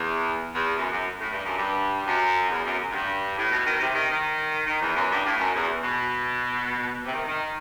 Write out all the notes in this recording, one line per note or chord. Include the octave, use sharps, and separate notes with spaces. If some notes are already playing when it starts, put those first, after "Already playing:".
Already playing: E2
E2
F#2
F#2
A2
G2
F#2
G2
F#2
E2
F#2
F#2
A2
G2
A2
B2
D#3
C3
D#3
D#3
D#3
E2
F#2
G2
A2
F#2
E2
B2
C3
D#3
D#3